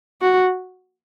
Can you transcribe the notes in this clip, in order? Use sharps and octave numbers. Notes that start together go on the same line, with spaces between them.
F#4